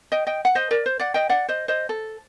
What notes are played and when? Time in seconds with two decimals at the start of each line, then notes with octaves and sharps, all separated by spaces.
0.12 D#5 G5
0.27 D#5 G5
0.45 F#5
0.55 C5 D#5
0.71 A#4 D5
0.86 C5
0.99 D5 F#5
1.14 D#5 G5
1.29 D5 F#5
1.48 C5 D#5
1.68 C5 D#5
1.89 A4